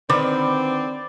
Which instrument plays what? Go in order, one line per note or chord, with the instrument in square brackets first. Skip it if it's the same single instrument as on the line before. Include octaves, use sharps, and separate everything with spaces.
[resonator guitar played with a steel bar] D3 D#3 B4 [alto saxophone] C4 [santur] D5